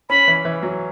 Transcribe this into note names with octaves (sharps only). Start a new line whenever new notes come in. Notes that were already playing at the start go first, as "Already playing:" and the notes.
C#4 B5
E3
E3
F#3